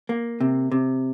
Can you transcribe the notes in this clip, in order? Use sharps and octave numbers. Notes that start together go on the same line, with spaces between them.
A#3
C3
C3